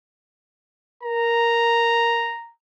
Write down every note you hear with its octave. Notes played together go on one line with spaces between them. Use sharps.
A#4 A#5